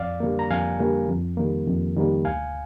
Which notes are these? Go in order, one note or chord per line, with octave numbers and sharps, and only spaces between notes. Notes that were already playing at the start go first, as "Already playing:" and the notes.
Already playing: F2 D5 F5
D3 G3 A#3
A#5
F2 F5 G#5
D3 G3 A#3
F2
D#3 G3 A#3
F2
D#3 G3 A#3
D2 F5 G#5